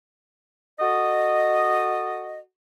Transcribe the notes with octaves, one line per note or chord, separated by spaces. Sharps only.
F#4 A4 D#5